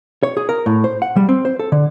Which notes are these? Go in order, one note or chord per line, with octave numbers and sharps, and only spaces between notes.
C#5
G#4
A#4
A2
C5
F#5
G3
C4
C5
A4
D3